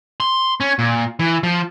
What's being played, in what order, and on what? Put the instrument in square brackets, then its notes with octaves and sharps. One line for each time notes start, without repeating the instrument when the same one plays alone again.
[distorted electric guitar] C6
C#4
A#2
E3
F3